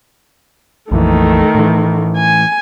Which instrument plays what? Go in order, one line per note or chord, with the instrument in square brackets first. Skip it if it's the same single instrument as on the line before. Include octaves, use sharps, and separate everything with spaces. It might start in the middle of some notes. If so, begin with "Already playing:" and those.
[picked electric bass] A#1 F2 E3 [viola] D#3 A3
[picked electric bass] A2 E3
[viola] G#5